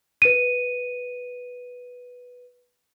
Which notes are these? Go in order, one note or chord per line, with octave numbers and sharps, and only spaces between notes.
B4 D#7